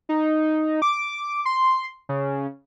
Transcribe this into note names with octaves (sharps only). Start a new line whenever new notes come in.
D#4
D6
C6
C#3